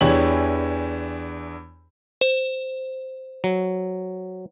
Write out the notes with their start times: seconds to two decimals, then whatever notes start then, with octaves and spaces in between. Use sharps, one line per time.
0.01 E2 E3 D4 G4 C#5 F#7
2.21 C5
3.44 F#3